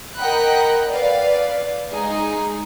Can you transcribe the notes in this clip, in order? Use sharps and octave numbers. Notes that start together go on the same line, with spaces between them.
A#4 D#5 F#5 G5 B5 F#6
B4 D5 F5
G#3 D#4 G#4